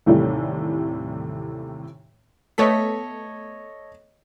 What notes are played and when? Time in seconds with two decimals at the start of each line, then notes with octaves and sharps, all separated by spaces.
0.06 D#2 A2 C3 E3 G3 A3
2.58 A3 B3 A4 C#5 D#5 B6